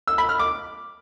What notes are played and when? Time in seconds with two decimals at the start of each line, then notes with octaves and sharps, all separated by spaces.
0.07 E6
0.18 B5
0.29 F6
0.40 D6